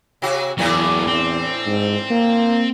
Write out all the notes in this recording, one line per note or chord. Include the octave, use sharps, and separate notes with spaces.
C3 F#4
E2 A2 E3 F#3 D4 G#4
C4
G#2
A#3